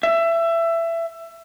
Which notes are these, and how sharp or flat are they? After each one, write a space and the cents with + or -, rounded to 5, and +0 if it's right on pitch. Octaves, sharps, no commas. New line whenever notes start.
E5 +20